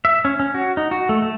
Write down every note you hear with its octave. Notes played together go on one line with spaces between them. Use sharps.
E5
C#4
C#4
F#4
D#4
F#4
A3
A3